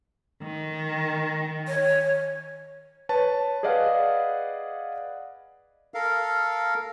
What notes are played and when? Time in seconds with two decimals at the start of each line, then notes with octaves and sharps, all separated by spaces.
0.43 D#3
1.68 C#5
3.09 B4 C#5 A5
3.63 G#4 B4 D5 D#5 F5 F#5
5.94 A4 A#4 F5